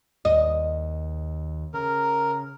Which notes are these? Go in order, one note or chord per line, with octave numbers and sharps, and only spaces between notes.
D#2 D#5
C#3 A#4